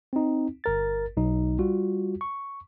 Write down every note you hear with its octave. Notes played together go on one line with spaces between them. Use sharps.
C4 D#4
G1 A#4 A6
B1 D#4
G3 F4 F#4
C#6